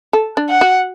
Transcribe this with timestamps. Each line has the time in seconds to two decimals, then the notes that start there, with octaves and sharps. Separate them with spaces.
0.13 A4
0.37 D4
0.49 F#5
0.61 F#4